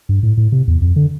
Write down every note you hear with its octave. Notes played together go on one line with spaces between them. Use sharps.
G2
A2
A2
C3
E2
F2
D3